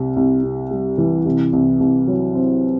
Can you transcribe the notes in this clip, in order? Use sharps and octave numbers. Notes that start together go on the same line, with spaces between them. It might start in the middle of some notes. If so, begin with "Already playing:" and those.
Already playing: C2 C3
C2
C3
G3
E3
C2
C2
C2
F#3
C4